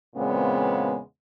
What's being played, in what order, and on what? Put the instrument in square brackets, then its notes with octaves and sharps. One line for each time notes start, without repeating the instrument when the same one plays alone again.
[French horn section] E2 A#2 C#3 G#3 B3 C4